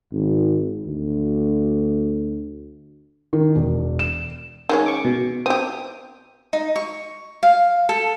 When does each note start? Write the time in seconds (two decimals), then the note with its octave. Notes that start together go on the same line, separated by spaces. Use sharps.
0.12 G#1
0.86 D2
3.33 D#3
3.55 E1
3.99 E7
4.69 D#3 G#3 C#4
4.86 C#6 D6
5.05 B2
5.46 C4 G4 D#6
6.53 D#4
6.76 C#6
7.43 F5
7.89 A4